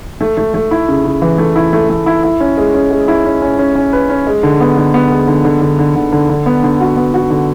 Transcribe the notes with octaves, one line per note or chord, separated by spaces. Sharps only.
A3
A3
A3
E4
C#3
C#3
E3
A3
E4
A3
A3
E4
E4
C#4
G#3
C#4
G#3
E4
C#4
C#4
C#4
C#4
B4
C#4
G#3
D3
B3
D3
B3
G#3
D3
D3
D3
D3
D3
D3
D3
B3
D3
F#4
B3
F#4
D3